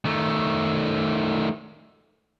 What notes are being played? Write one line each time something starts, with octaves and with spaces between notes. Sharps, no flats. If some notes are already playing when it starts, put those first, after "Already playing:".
D#3 A3